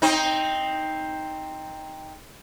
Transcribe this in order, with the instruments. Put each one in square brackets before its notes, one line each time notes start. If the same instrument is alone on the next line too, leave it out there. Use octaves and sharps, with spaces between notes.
[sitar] C4 D#4